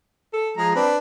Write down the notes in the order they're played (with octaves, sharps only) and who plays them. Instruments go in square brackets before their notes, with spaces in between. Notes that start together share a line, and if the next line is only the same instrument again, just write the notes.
[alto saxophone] A4
[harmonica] F3 G#4 A#5 [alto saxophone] G#3
[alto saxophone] C4 [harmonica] D4 B4